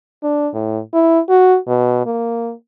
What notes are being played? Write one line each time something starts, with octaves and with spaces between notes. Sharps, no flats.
D4
A2
E4
F#4
B2
A#3